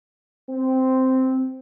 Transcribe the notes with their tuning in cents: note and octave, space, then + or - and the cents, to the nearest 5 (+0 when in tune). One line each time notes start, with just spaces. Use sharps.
C4 -5